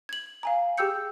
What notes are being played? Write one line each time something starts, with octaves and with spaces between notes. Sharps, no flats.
G#6 F#7
F5 G#5 A#5
G4 G#4 G5 E6 G6 C#7